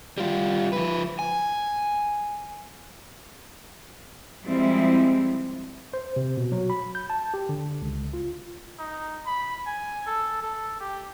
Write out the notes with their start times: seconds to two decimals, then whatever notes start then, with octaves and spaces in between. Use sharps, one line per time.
0.18 G3 F4
0.73 F3 B4
1.19 G#5
4.46 F3 G3 G#3 C4 E4
5.94 C5
6.16 C3
6.37 B2
6.52 F#3
6.70 B5
6.95 G6
7.10 A5
7.34 G4
7.49 D3
7.82 C#2
8.14 F4
8.79 D#4
9.26 B5
9.66 G#5
10.07 A4
10.43 A4
10.80 G4